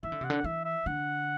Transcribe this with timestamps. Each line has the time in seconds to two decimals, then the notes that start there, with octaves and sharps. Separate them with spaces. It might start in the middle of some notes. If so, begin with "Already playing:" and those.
0.03 E3 E5
0.12 D3
0.21 C3 F#5
0.30 D3
0.44 E3 E5
0.65 E5
0.86 D3 F#5